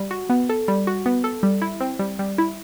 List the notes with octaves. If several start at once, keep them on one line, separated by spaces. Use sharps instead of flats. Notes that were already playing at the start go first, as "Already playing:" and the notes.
Already playing: G3
F#4
B3
A4
G3
F#4
B3
A4
G3
E4
C4
G3
G3
E4